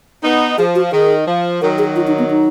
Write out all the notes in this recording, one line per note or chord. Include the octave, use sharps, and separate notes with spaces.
B3 D#4
F3 G#4
F#4
D#3 G#4
F3
D#3 F#3 A#4
G#4
F4
D#4
B3
D#4